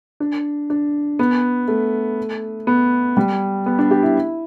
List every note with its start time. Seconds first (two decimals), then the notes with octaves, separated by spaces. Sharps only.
0.20 D4
0.70 D4
1.19 B3
1.68 A3
2.67 B3
3.17 G3
3.66 B3
3.79 D4
3.91 G4
4.03 E4